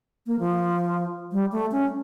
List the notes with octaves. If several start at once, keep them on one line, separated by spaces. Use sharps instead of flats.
A#3
F3
G3
A3
C#4